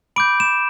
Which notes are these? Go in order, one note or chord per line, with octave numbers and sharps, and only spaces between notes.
B5 D6 G6 D7
E7